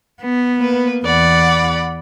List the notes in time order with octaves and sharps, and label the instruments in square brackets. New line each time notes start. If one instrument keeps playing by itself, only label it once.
[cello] B3
[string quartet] A#3 B4
[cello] E2 [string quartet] D5 F#5 B5